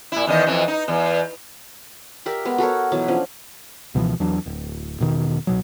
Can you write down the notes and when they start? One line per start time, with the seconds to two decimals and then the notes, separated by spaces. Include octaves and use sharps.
0.12 A#2 E4
0.27 E2 D#3 D#5
0.47 F2 E3
0.68 D#4
0.88 E2
2.26 G4 A#4 D5 E5
2.45 G#3 B3 A#4
2.58 F#4 A4 A#4 C#5
2.92 B2 E3 F#3 A5
3.08 F3 C#4 D4
3.94 C#2 B2 E3 F3
4.20 E2 E3 F#3 D4
4.46 D1
5.00 E2 B2 D#3
5.47 C2 B2 F#3